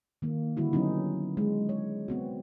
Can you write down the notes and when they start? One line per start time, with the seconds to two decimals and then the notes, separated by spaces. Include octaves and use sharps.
0.22 D#3 A#3
0.57 D3 G3 E4 F#4
0.73 F#3 B3 C#4 D#4
1.37 G#3
1.69 C#5
2.08 B3 C4 F#4